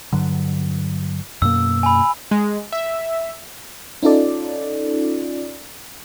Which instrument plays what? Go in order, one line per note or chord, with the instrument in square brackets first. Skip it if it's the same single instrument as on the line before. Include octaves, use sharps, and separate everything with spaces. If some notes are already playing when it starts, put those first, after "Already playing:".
[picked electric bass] G2 D3 F#3
[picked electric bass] F#2 B2 A#3 [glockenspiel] E6
[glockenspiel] G#5 B5
[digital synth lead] G#3
E5
[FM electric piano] C#4 D#4 F4 A4 D5